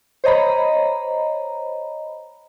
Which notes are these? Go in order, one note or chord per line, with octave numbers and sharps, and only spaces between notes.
C5 C#5 D#5 A#5 B5